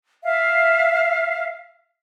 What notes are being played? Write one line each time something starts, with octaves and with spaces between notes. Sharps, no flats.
E5 F5